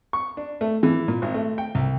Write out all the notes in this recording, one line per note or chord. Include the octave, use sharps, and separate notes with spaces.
C#6
D4
A3
E3
A#2
G#1
A3
G5
C2